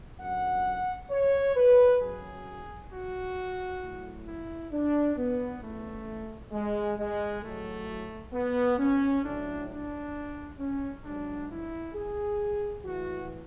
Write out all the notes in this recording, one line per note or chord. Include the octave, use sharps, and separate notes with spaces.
F#2 D3 F#3 F#5
C#5
B4
F#2 C#3 F#3 G#4
F#4
A2 F#3
E4
D4
B3
E2 C#3 E3 A3
G#3
G#3
A2 F#3 A3
B3
C#4
A2 F#3 D4
D4
C#4
G#2 F#3 D4
E4
G#4
A2 E3 F#4